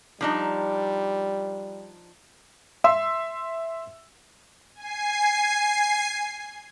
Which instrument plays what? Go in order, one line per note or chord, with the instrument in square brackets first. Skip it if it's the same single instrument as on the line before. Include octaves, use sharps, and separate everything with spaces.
[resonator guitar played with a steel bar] F3 D4 D#4 [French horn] G3
[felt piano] E5 C6 E6
[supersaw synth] G#5 C7